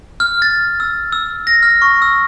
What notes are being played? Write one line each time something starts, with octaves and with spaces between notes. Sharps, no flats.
F6
A6
E6
E6
A#6
F6
C#6
E6